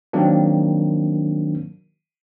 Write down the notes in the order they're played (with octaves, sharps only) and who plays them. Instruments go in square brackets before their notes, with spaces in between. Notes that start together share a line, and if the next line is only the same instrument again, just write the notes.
[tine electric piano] D#3 F#3 A#3 C4 D4